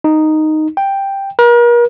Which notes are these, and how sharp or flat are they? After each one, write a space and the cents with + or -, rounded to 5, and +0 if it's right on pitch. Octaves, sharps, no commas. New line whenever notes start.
D#4 -5
G5 +5
A#4 +40